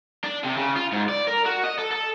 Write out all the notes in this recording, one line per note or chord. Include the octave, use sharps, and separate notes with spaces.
D4
C3
C#3
F4
G#2
D5
A#4
F#4
D#5
A4
A4